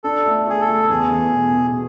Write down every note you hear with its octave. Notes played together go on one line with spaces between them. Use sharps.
D4 A4
A3
A3 G#4
A4
A3
E2 G#4
E2
B2
B2